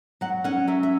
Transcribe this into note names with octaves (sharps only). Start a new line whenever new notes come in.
F#3 F#5
C#4 F#5
F#3 E5
E5